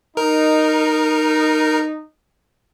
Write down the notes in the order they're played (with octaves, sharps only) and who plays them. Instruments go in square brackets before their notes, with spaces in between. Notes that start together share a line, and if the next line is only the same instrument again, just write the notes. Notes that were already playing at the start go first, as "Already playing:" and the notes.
[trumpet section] D#4 [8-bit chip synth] A#4